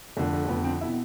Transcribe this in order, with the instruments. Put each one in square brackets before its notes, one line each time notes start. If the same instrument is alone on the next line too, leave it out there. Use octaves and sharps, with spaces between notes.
[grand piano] F2 D3 A3
A3
A3
F2 D3 B3
C4
B2 E4